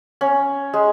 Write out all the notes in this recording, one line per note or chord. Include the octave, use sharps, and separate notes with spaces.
C#4
G#3